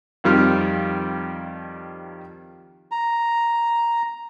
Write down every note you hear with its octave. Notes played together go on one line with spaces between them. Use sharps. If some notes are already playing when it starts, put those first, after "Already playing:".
F2 D#3 F3 G3 F6
A#5